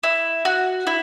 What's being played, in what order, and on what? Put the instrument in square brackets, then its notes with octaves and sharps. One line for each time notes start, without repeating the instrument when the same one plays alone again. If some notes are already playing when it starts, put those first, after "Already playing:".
[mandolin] E4
F#4
E4